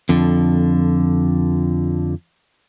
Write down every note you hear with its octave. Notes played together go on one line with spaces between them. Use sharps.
F2 D3